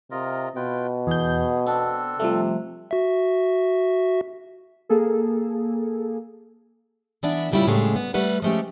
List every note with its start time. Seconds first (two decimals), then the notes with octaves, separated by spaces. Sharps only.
0.11 C3 F4 A#4 D#5
0.56 B2 F4 B4 G5
1.07 E2 G#4 G6
1.66 B3 C4 D4 A4
2.20 C3 F3 G3 A3
2.91 F#4 E5
4.89 A#3 G#4 A4
7.23 E3 B3 D4 D5 E5
7.52 A2 C#3 G3 C#4 E4 F4
7.67 A2 C#3 G#3 A3 D4
7.96 B3
8.14 G3 A3 B4 F#5
8.42 F3 G#3 A3 C#4 G4